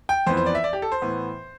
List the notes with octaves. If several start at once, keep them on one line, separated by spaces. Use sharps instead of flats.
G5
F2 E3 B3 C5
C5
D5
E5
D5
G4
A4
C5
A2 E3 B3